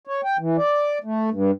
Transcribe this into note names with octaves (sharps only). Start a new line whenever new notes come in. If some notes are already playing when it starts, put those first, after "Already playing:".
C#5
G5
E3
D5
A3
G2